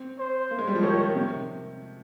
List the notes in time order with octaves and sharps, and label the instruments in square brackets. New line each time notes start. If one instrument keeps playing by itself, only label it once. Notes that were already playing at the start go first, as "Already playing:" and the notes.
Already playing: [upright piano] C4
[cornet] C5
[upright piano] A#3
G#3
G3
F3
[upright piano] D#3 [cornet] C#5
[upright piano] D#3
C3